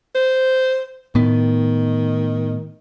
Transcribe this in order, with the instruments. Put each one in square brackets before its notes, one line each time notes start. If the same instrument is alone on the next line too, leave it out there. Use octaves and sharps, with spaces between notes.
[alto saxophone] C5
[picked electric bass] A2 B3 [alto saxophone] D#3